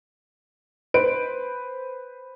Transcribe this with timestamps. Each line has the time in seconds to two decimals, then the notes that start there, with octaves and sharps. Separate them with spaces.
0.94 B4 C5 D7